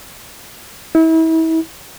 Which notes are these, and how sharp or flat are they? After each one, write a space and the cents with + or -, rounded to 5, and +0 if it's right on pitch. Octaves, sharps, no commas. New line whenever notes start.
E4 -35